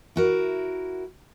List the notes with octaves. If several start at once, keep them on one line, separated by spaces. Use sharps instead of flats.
E4 F#4 A#4